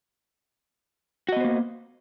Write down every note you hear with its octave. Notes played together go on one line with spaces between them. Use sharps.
A#3 B3 F#4 C5 D#5